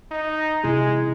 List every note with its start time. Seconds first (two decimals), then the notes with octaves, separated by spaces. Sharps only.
0.11 D#4
0.64 C3 G#3 E4 G#4